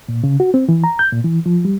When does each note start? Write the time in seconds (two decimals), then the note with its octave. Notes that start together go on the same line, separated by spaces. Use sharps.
0.09 A#2
0.24 C#3
0.40 F#4
0.54 C4
0.69 E3
0.84 A#5
0.99 G6
1.12 A#2
1.24 E3
1.46 F3
1.65 G3